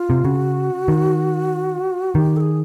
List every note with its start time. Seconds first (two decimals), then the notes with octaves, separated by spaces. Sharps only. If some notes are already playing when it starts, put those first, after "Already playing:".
Already playing: F4
0.10 C3
0.25 C#3 F#4
0.88 D#3
2.15 D#3 G4
2.37 A4
2.40 G#4